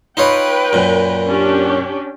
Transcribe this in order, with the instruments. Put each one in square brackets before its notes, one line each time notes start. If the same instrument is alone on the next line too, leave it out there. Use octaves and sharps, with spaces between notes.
[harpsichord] D#4 F4 C#5 [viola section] B4 G5
[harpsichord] F#2 A#2
[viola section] C#4 D4 G4